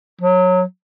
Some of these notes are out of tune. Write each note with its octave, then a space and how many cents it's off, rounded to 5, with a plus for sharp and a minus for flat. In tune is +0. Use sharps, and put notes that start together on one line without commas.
F#3 -20